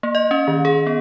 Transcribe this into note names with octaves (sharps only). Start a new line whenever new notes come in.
A#3
D#5
C#4
D#3
G#4
B3